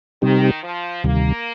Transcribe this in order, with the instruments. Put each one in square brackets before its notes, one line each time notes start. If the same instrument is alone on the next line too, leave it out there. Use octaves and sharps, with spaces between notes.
[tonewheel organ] C3 G3 C4 D#4 G4 [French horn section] D#3
[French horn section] F3
[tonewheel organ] D2 C3 D#3 G3 [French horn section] A#3